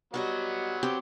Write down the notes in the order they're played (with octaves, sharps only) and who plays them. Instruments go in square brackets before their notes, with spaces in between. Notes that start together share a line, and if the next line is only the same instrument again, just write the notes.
[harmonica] F#3 B3 [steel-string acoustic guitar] G3 F#4 D#5
[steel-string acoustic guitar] C4 G4